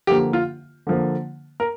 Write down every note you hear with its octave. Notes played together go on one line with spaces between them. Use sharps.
D3 F3 A#3 G4
F4
D3 F3 A#3
A#4